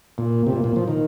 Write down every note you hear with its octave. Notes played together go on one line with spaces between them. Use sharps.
A#2
C3
A#2
A#2
F3
D#3